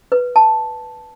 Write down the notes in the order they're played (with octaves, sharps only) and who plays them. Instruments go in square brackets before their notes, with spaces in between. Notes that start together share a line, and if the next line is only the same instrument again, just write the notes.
[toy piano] B4
A5